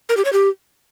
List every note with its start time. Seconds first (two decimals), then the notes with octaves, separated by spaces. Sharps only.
0.09 A#4
0.17 G4
0.25 C#5
0.33 G4